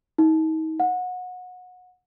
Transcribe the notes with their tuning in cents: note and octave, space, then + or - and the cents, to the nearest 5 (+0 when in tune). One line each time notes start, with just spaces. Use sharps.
D#4 +35
F#5 -25